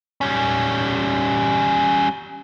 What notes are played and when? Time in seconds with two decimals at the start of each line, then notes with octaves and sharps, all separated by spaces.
0.21 G3 C#4